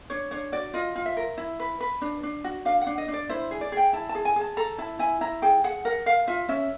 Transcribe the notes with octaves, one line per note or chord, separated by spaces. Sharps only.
D4 C#5
D4 C#5
F#4 D5
F4 D#5
F4
E5
A#4
E4
B4
B4
D4
D4
F#4
D4 F5
F#5
D4
D#5
D4
D5
E4 C5
G#4
D5
G#4
G5
E4 A5
A5
G#4
G#5
G#4
A5
A4 A#5
E4 A5
E4 G#5
E4 A#5
G#4 G5
G#4 F#5
A#4 F#5
A#4 F5
F4 E5
C#4 E5